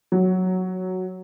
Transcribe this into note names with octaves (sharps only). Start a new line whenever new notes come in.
F#3